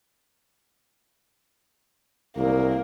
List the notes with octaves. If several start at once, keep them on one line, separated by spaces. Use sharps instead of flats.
C2 A#3